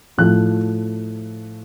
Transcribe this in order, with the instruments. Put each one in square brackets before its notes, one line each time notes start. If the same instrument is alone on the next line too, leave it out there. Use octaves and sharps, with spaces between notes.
[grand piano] A2 F3 A3 F#6